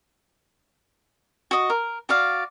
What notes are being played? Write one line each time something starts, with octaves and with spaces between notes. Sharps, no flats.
F#4 D#5
A#4
F#4 D5 F5